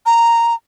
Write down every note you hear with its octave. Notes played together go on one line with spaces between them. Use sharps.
A#5